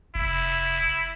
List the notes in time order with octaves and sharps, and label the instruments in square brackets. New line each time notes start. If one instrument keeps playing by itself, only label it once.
[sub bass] F1 [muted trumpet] E4